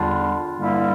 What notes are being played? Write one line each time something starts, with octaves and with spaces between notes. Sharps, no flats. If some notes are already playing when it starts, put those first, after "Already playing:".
Already playing: E2 D3 G3 D4 F4
G2 D3 G3 A#3 E4